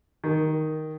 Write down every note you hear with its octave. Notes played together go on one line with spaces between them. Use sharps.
D#3